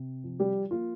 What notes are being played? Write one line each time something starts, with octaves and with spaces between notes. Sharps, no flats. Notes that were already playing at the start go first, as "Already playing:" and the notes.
Already playing: C3
F3
G3 G4
A#3 F4